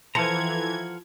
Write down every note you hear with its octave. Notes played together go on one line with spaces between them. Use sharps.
E3 F3 A4 C5 F5 F#5 A#5 G#6